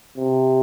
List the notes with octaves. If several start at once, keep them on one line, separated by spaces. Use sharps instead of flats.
C3